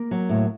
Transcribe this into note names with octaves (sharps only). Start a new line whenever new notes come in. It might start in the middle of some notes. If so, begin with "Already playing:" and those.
Already playing: A#3 A#4
F#3
A2